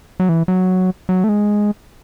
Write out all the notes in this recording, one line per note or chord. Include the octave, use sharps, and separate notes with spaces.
F#3
E3
F#3
F#3
A3
G#3